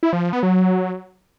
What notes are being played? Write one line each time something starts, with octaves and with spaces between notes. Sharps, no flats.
E4
F3
F3
B3
F#3